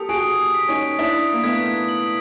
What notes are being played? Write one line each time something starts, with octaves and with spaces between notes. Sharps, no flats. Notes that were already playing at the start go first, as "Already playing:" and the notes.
Already playing: G4 A4 A#4 D#6
F#4 G#4 D7
B6
C#4 D#4
D4 E4 B6
A#3
A3 B3 G#6
F#7